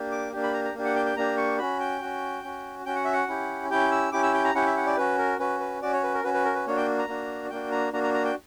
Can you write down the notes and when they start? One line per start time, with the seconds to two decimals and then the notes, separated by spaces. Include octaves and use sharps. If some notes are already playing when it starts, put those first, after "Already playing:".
Already playing: A#3 D4 G4
0.12 D6
0.32 A#3 D4 G4
0.43 B5
0.54 A#5
0.65 A#5
0.74 A#3 D4 G4
0.85 F#5
0.96 G5
1.06 G5
1.16 A#3 D4 G4 A#5
1.37 C#6
1.59 C#4 F#4 B5
1.80 G5
2.01 C#4 F#4
2.44 C#4 F#4
2.86 C#4 F#4 G5
2.95 F#5
3.04 E5
3.13 F#5
3.28 C#4 E4 G4
3.70 C#4 E4 G4 G5
3.91 E6
4.12 C#4 E4 G4 D6
4.23 E6
4.34 G5
4.44 A#5
4.55 C#4 E4 G4 F#5
4.66 E5
4.77 F#5
4.86 D5
4.97 C#4 F#4 B4
5.18 A#4
5.39 C#4 F#4 B4
5.60 B4
5.82 C#4 F#4 D5
5.93 C#5
6.03 B4
6.14 A#4
6.24 C#4 F#4 B4
6.34 B4
6.45 A#4
6.55 B4
6.67 A#3 D4 F#4 C#5
6.77 G5
6.98 A#5
7.08 A#3 D4 F#4
7.50 A#3 D4 F#4 G5
7.72 A#5
7.93 A#3 D4 F#4 A#5
8.03 A#5
8.14 A#5
8.25 G5